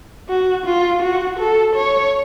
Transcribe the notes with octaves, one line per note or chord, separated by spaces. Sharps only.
F#4
F4
F#4
A4
C#5